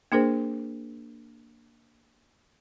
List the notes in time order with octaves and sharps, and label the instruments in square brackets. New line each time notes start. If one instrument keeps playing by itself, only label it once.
[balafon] A#3 D4 G#4 A#4 C5